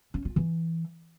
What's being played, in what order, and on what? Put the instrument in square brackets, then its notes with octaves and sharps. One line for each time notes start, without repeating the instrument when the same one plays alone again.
[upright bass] C#4
F4
E3